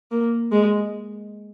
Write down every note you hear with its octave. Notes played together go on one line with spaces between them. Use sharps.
A#3
G#3